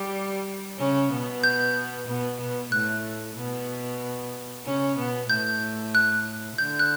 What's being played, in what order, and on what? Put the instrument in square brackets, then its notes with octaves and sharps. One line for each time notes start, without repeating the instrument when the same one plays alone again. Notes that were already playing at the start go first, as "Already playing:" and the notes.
Already playing: [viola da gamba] G3 G4
C#3 C#4
B2 B3
[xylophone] G6
[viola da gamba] B2 B3
B2 B3
[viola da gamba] A2 A3 [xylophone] F#6
[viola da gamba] B2 B3
C#3 C#4
B2 B3
[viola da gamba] A2 A3 [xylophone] G6
[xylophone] F#6
[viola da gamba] D3 [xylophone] G6
[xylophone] F#6